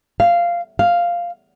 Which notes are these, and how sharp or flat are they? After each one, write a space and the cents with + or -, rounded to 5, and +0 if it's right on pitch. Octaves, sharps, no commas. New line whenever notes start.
F5 -10
F5 -5